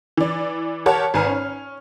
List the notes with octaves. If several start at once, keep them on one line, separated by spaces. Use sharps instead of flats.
E3 D5
G4 A#4 C#5 F#5 A5
G#1 B4 G#5 A#5 F6
C#4